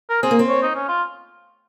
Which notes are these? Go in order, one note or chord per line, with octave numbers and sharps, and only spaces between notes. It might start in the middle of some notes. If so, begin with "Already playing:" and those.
A#4
C4 G#4
A#3
C4
C#5
D#4
C#4
F4